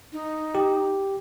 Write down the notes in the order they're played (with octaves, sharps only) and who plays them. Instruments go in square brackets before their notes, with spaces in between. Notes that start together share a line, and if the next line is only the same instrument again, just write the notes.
[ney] D#4
[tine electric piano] G4